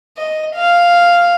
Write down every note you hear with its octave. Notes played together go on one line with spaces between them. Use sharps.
D#5
F5